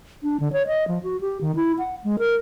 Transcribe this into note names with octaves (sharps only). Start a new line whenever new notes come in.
D4
D3
C#5
D#5
F3
F#4
G4
D#3
E4
F#5
G#3
A#4